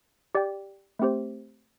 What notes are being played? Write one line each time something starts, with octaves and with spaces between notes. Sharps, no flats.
G4 D5 G5
A3 C4 G4 C5